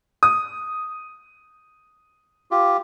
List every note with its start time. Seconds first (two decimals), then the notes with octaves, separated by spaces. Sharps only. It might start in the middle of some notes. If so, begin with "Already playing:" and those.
0.23 D#6
2.51 F4 G4